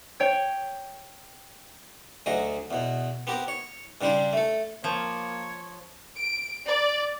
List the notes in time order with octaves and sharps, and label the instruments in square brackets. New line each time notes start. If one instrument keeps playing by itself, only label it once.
[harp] C#5 G5 G#6
[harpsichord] D2 F#3 G#4 D#5
E2 B2
B3 C4 G4 A#4
C#5
G2 C#3 G3 D4 C5
A3 A4
[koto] F3 [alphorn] A#3 [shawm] C#5
[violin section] D7
D5